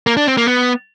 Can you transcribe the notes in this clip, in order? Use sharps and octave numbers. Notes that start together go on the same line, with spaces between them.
A#3
D4
C4
A#3
B3